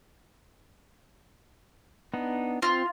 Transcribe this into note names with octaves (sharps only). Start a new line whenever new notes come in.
B3 D4 D#4
C4 F4